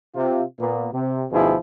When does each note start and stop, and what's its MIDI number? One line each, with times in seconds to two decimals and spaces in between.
0.15 0.42 48
0.15 0.42 65
0.59 0.88 46
0.59 0.88 58
0.59 0.88 59
0.93 1.24 48
1.31 1.55 38
1.31 1.55 47
1.31 1.55 53
1.31 1.55 63
1.31 1.55 64
1.31 1.55 68